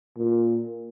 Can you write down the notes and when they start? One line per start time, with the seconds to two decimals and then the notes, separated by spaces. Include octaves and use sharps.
0.17 A#2